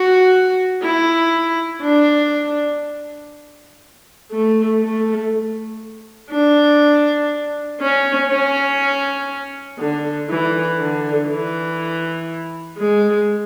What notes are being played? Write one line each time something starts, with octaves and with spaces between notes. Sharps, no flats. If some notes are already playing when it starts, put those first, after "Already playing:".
Already playing: F#4
E4
D4
A3
A3
D4
C#4
C#4
D3
E3
D3
E3
G#3